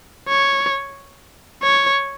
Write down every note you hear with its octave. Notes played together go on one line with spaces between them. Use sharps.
C#5
C#5